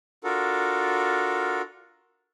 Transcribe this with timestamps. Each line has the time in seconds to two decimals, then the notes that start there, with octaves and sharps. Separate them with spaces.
0.24 D4 F4 F#4 A4 A#4